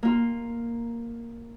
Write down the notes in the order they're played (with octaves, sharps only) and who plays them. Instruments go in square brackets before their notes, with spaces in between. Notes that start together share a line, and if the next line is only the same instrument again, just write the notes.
[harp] A#3 F4